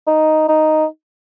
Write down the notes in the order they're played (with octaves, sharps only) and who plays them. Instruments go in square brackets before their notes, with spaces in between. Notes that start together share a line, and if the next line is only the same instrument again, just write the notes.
[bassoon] D#4
D#4